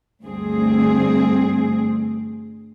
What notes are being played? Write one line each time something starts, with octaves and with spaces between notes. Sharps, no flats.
D2 G2 C4 G#4